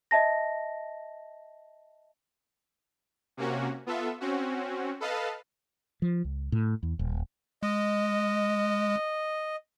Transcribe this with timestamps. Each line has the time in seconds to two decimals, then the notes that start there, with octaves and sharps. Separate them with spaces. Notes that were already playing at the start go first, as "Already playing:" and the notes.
0.11 D#5 E5 A5 A#6
3.37 C3 A#3 C#4 F#4
3.86 B3 F4 A4 E5
4.20 C4 C#4 F#4
5.00 A4 B4 D#5 F5 A5
6.02 F3
6.25 C#2
6.52 A2
6.83 E2
6.99 D#1
7.63 G#3 D#5